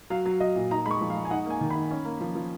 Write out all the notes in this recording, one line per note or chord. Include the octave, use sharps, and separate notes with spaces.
F#3 F5
F#3
F#3 D#5
A#2
D#4 A#5
G#3 B5 C#6
F3
F5
G#3
G#5
D#4 F#5
A#3 G#5
D#3
D#4 B5
C#4
A#3
F3
F3